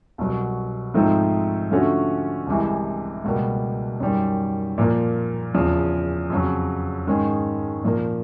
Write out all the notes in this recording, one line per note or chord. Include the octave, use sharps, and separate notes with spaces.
C2 B2 F#3
G#2 F3 A3 C4 D#4
D3 F3 A3 C#4 F#4
C2 C3 E3 G#3
C#2 B2 G3 A#3
F#2 D#3 G3
A#2 F3 A#3
E2 C#3 F3
F2 C#3 F#3
G#2 D#3 G#3 C#4
A#2 F3 A#3